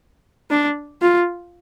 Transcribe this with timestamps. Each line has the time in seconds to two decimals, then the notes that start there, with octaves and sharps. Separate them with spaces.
0.51 D4
1.01 F4